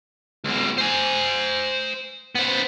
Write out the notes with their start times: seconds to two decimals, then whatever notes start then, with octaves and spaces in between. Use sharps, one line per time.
0.45 C#2 B2
0.78 C5 G#5
2.35 B3 C5